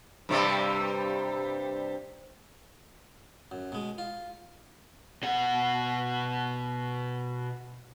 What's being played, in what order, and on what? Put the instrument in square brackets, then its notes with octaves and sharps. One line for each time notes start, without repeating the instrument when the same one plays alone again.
[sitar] G2 C3 G3
[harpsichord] F#2
B2 G#3
F4
[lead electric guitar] B2 F#5